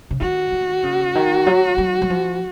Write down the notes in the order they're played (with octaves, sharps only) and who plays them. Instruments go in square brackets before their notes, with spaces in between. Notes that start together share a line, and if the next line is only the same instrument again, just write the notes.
[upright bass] C#3
[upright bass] D#3 [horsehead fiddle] F#4
[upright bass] D#3
C#3
D#3
F#3
F#3
F#3
F3